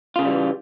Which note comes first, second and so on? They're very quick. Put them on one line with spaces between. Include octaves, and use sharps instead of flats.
F4 C#3 A#3 G3 E3